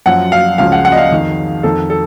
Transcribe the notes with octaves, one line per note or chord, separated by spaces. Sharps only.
F#2 F3 F#5
F5
C#2 C#3 F3 F5
F#5
F#5
D#5
F5
F2 D#3
F2 D#3 A4
A4